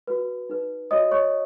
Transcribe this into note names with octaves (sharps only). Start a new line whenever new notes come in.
F#4 B4
D#4 B4
F#4 C#5 D#5 D#6
C#5 C#6